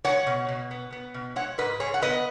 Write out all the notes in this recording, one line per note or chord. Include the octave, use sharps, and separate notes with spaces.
G#3 C#5 F#5
B2
B2
B3
B3
B2
G#3 C#5 F#5
G#2 B4 D#5
G#2 G#4 C#5
F#5
B3 B4 D#5